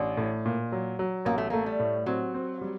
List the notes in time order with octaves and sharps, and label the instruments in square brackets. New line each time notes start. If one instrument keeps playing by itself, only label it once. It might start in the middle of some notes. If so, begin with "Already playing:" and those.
Already playing: [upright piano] A1 [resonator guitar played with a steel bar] D4
[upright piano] A2
A#2
F#3
F#3
[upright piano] A1 [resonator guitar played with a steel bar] A#3
[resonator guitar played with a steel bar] A3
[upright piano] A3 [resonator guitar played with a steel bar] A#3
[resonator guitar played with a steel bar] G3
[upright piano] A2
[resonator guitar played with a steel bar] F#3 [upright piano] C4
[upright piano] C4
G3